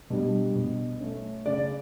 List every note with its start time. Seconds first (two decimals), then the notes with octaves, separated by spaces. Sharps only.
0.10 B2 G3 D4
0.55 B2
1.00 A3 C#4
1.46 C#3 D5